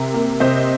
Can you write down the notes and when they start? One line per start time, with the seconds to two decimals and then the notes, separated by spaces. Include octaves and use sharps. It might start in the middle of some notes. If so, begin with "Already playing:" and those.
Already playing: C3 A#4
0.14 A#3
0.40 C3 C5 D#5